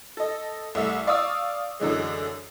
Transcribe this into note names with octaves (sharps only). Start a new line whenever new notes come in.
A4 D#5
C2 A3 E5
D5 F5 C#6 D#6 E6
F#2 D3 E3 G#3